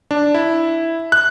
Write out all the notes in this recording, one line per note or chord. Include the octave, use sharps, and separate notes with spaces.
D4
E4
F#6